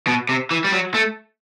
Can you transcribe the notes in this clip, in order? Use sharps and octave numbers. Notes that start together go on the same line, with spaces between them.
B2
C3
E3
G3
F#3
A3